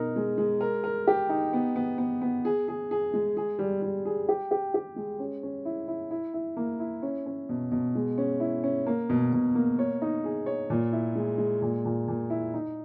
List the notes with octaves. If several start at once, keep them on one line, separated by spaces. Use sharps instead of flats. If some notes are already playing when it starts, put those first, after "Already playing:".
Already playing: B2 D#4 A#4
G#3
G#3
A#4
A#4
G4
D#4
B3
B3
B3
B3
G#4
G#4
G#4
G#3
G#4
G3
G3
G#4
G4
G4
G4
G#3
C#4
C#4
E4
E4
E4
E4
A#3
E4
C#4
C#4
B2
B2
G#3
C#4
E4
C#4
A#3
B2
B2
A#3
C#5
D#4
G#4
C#5
A#2
E4
G#3
G#3
A#2
A#2
A#2
E4
D#4